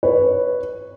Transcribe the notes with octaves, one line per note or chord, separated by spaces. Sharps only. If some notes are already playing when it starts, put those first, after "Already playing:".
B4 C#5